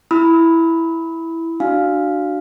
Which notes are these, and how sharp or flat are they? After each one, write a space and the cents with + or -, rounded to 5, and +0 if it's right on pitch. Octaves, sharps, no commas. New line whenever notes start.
E4 +0 B5 +0 E6 -40
D4 +20 F#4 +0 F5 +0